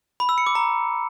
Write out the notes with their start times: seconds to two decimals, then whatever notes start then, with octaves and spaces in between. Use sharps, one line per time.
0.20 B5
0.29 E6
0.38 C#7
0.47 D6
0.55 A#5